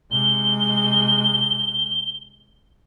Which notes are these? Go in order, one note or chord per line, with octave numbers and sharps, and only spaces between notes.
C3 G#3 G7